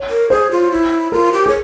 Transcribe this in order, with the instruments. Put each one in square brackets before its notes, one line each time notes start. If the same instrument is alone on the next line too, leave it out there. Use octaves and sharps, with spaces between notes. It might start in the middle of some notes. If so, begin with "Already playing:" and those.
Already playing: [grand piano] C#5
[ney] A#4
[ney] G#4 [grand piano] C5
[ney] F4
E4
[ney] F4 [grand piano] A#4
[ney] G4
[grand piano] G#4 [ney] C#5